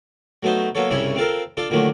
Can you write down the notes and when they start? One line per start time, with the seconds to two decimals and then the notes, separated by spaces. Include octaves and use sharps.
0.43 F#3 A3 B3 D#4 C5
0.75 F#3 A#3 B3 A4 C#5
0.90 C2 G2 C#3 C#4 E4 C#5
1.16 C4 F4 A4 A#4
1.57 D4 F4 A4
1.70 A#2 D3 D#3 F#3 A3